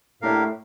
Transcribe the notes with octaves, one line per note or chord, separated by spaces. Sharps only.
A2 A#3 D4 G4 A#4 F5